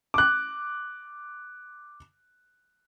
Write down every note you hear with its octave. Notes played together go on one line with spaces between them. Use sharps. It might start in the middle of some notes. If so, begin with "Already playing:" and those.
D6 F#6